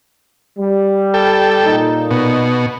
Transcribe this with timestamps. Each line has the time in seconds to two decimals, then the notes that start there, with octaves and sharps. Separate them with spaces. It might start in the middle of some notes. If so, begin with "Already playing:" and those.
0.58 G3
1.14 A4 G5
1.66 A#2 D#4
2.11 B2